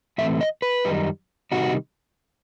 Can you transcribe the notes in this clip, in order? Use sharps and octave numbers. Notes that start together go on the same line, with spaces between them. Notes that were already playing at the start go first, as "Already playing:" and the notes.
A2 E3 A3 C4 E5
D#5
B4
F#2 D#3 G3 D#4
C3 D#3 G3 D#4 F#4